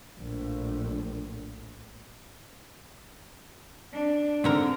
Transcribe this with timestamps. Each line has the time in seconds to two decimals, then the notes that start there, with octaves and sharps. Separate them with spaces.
0.19 A#1 A2
3.93 D4
4.44 G#2 D3 C4 A#4